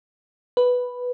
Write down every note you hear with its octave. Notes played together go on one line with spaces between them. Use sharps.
B4